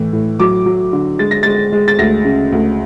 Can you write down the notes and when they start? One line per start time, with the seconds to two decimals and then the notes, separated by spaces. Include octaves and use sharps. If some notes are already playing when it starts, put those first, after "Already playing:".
Already playing: A2 E3
0.13 A2
0.40 F#3 D6
0.66 F#3
0.93 D3
1.19 G#3 A6
1.31 A#6
1.43 G#3 A6
1.72 G#3
1.88 A6
1.99 D2 A#6
2.25 C#3
2.52 D2